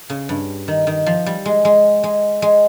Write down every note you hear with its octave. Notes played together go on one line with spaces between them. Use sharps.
C#3
G2
D#3
D#3
F3
G3
G#3
G#3
G#3
G#3